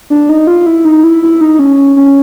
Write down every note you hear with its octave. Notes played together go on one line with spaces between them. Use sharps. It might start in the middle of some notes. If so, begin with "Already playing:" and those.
D4
D#4
F4
E4
D#4
E4
E4
D#4
C#4
C#4